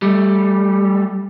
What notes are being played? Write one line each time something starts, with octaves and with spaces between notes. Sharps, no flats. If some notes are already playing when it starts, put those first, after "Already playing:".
G3 A3